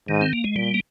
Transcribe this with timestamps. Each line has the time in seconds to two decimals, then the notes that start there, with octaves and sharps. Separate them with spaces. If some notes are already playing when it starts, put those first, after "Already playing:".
0.09 G#2 D#3
0.21 C4
0.33 A#3
0.44 G#3
0.56 A#2 G3
0.74 A#3